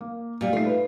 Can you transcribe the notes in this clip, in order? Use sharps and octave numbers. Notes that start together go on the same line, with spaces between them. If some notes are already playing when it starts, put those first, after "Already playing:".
A#3
A#2 G3
A3 D#4 F4 C7
B4